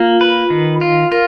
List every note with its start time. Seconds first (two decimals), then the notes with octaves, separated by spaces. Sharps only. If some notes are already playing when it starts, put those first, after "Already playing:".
Already playing: A#3 F4
0.21 B4
0.50 D#3
0.81 F4
1.12 F4 A#4